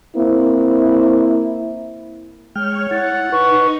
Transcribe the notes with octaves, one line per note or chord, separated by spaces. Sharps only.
A#3 C4 E4
G#3 C#5 G5 F6
E4 F#5 A6
D#4 B4 C#6